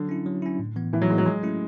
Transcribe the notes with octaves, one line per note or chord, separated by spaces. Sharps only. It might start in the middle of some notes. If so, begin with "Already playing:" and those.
Already playing: D3 F#3
C#4 E4
F#3
C#4 E4
A2
E3 B3
A2 E3
F#3
E3 F#3 G#3 B3
F#3 G#3
A3 C#4 E4